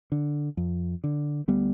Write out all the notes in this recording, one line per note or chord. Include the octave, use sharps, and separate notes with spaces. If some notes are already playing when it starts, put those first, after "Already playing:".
D3
F2
D3
D2 G3 B3